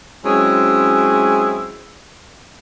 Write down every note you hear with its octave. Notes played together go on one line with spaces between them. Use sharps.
F#3 G#3 C4 C#4 E4 G#4